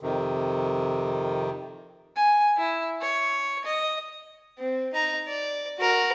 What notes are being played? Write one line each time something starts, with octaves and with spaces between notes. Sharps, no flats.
F2 C3 D#3
G#5
E4
C#5
D#5
C4
D#4 A#5
D5
F#4 A#4